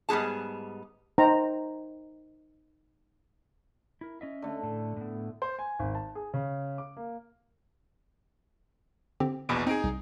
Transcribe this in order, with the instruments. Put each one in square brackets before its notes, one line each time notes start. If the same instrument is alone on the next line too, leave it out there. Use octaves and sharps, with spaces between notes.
[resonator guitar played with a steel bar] G#2 G3 B3 G#4 A5
[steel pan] D#4 C5 G5 A#5
[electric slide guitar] E4 A#4
C#4 D#5 E5
[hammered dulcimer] D3 A3
[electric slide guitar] A2 A4
A2 B3
[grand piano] C5
G#5
G#1
A5
G#4
C#3
D6
A#3
[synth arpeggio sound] D3 C4 G4
[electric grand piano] A#1 E2 B2 [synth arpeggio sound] B5 D#6 D7
[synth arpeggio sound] C4 D7 [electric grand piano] D#4 G#4
[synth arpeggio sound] C2